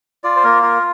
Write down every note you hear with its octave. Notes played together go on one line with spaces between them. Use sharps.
F4 D5
C5
A#3 A#4
F4 A#4